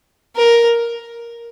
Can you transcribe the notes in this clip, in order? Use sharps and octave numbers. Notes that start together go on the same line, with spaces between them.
A#4